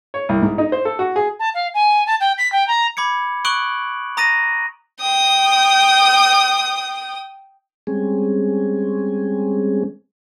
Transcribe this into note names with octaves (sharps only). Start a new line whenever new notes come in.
C#5
C2
G#2
D#4
C5
A4
F#4
G#4
A5
F5
G#5
A5
G5
B6
G5
A#5
B5 D6 G#6 C#7
C#6 D#6 F#6 D7 F#7
A#5 D#6 A6 A#6 D#7
G5 D#6
G3 G#3 C4 C#4 G#4